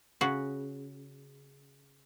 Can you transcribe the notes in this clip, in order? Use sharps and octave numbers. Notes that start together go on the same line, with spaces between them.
C#3 F#4